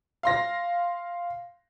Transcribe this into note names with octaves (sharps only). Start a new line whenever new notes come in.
F5 C6 A#6